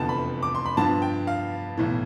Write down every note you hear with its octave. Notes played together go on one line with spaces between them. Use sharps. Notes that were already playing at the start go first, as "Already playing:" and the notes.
Already playing: F1 E2 D3 F3 B3 G5 A5
B5
D6
C6
B5
G2 F3 B3 A5
G5
F5
B1 A2 E3